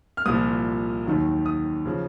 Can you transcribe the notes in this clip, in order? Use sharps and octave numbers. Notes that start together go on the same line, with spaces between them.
F6
C2 A#2 F3 D#6
D#2 D#3 F#3
D#6
C#3 F3